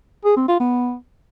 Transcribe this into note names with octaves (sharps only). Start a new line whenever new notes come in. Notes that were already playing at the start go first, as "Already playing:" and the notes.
G#4
C4
F4
B3